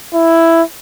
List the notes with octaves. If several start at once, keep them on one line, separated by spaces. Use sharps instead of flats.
E4